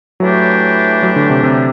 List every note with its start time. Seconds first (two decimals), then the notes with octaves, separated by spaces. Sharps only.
0.20 A2 E3 F#3 A3 D4 G4
1.03 F#3
1.16 D3
1.30 C3
1.44 C3